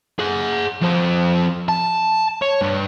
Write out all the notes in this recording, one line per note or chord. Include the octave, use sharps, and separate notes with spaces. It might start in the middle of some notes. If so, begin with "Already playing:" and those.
G#4 F#5
F2 C4
A5
C#5
G2